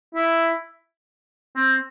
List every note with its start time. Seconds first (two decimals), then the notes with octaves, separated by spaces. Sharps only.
0.14 E4
1.56 C4